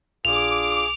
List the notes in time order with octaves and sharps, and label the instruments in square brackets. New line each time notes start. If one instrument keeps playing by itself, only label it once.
[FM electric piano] A#1 [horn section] D4 F4 G#4 [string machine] D6 [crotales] F7